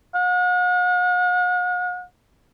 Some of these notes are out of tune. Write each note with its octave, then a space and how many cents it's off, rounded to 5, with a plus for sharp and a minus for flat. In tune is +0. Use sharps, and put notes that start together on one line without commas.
F#5 -45